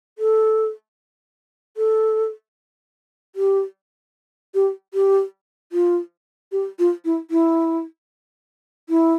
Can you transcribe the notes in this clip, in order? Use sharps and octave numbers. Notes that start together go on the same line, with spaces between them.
A4
A4
G4
G4
G4
F4
G4
F4
E4
E4
E4